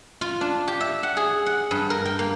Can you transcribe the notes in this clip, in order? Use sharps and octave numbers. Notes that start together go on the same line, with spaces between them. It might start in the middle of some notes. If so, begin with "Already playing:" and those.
F4
D4
G4
E5
F#5
G#4
F#5
G2
A#4
G5
A#3